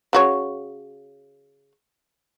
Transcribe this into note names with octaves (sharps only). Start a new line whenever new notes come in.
C#3 F#4 C#5